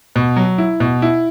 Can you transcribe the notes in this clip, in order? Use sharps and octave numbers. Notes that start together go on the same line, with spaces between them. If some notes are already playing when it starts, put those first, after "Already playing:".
B2
F#3
E4
B2
E4